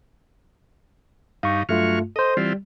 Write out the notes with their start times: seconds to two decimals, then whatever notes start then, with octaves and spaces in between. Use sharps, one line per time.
1.43 G2 D#4 F5 C#6
1.69 G2 F#3 A3 F4 C#6 F6
2.16 A4 C5 D#5
2.37 E3 G3 C4 F4